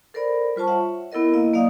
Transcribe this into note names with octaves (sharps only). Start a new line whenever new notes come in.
A4 A#4 C5 D5 B5
G3 F4 C5 A5 C#6
C#5 E5 F#5
B3 E4 A4 A#4 D#5
A#3 E4 D#5 F5
F#3 A#3 D5 D#5 F5 D#6